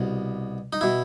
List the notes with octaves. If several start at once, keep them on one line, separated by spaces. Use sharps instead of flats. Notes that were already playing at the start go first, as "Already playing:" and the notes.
Already playing: C2 B2
D#4
B2 E4